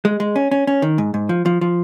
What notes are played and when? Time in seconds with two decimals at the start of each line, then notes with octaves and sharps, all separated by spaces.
0.05 G#3
0.20 G#3
0.36 C#4
0.51 C#4
0.67 C#4
0.82 D#3
0.98 G#2
1.14 G#2
1.29 F3
1.46 F3
1.61 F3